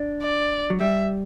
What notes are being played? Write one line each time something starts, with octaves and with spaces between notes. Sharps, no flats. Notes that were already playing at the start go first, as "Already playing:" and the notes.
Already playing: D4
D5
F#3
G3 E5